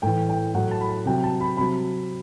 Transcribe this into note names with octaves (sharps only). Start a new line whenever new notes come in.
A2 E3 G5
G5
A2 F#3 F#5
A5
B5
A5
C3 F#3 G5
A5
B5
C3 F#3 B5